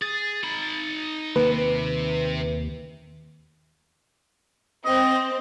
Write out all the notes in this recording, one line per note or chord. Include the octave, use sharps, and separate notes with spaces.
G#4 A6
D#4 B5
D#2 C3 B4
C4 D#5